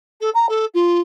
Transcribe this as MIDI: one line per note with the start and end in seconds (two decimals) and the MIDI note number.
0.20 0.30 69
0.34 0.46 82
0.49 0.65 69
0.74 1.00 65